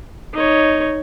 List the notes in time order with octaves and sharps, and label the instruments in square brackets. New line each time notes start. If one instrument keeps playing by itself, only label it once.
[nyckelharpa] D#4 C#5